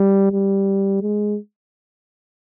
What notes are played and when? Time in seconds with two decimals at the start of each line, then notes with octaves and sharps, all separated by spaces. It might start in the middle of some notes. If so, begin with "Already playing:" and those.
Already playing: G3
0.32 G3
1.02 G#3